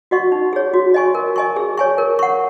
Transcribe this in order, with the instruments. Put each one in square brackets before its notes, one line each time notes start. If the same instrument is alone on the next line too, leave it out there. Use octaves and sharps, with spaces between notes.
[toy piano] F#4 D#5 F#5 C#6
D#4
G#4 C#5
F#4
D#5 G#5 C#6
A#4
D#5 G#5 C#6
G#4
C#5 G#5 C#6
A#4
F#5 C#6